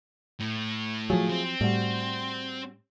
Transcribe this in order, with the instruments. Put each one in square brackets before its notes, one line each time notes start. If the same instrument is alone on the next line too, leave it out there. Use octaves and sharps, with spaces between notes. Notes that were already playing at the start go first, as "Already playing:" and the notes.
[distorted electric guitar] A2
[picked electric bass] F3 F#3 [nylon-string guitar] A3 F4 G#4
[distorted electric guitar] C4
[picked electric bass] A2 [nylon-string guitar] G3 F#4